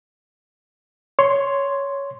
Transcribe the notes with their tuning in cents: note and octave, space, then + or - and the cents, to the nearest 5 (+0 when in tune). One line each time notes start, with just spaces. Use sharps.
C#5 +10 C6 +0